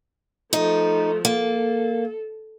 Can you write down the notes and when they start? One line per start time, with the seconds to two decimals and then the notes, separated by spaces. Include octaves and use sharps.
0.53 F3 A3 D#4
1.25 A#3 A4